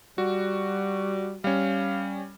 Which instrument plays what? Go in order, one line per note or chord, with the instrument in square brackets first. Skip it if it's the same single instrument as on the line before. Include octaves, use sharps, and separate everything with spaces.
[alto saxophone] G3 [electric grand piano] F#4
[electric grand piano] G3 C#4 [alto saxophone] F5